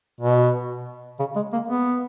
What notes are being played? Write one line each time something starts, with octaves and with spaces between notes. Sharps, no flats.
B2
C#3
G#3
A#3
B3